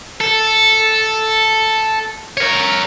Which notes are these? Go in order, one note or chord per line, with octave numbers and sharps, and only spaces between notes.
A4
A#4 C#5